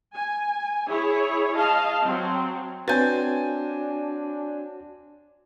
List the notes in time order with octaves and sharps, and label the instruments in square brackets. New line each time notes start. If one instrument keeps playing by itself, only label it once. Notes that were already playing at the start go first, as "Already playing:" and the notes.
[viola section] G#5
E4 G#4 C#5
D#5 F5 A5
F#3 C4
[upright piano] C4 G#5 A6 [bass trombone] D4 [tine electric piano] F#4 C#5 [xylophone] B4 G6